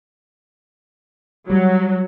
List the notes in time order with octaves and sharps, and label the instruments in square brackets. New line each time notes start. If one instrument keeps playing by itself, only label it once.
[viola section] F#3 [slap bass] G3